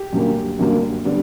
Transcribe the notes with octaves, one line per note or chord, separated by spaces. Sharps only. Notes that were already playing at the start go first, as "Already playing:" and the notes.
Already playing: G4
F#2 D3 G3 A#3
F#2 D3 G3 A#3
D3 G3 B3